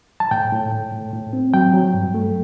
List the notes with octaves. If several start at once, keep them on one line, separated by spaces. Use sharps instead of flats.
A5
A2 G5
A2
A2
A2
A2
C4
F#3 G5
F#3
G2
A3